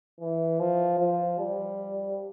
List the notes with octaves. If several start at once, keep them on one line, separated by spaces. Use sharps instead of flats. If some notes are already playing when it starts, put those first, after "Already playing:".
E3
F3
F3
G3